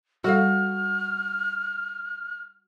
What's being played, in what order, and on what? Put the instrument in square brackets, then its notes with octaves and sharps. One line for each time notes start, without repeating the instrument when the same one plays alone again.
[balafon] G3 A4 F5 [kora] F#4 [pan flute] F6